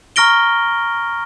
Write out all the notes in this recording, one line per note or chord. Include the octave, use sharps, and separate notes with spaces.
A#5 C#6 F6 A#6 D7 G7